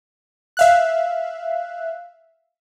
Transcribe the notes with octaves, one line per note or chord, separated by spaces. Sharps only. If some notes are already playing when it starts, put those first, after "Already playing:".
E5 F5 F#6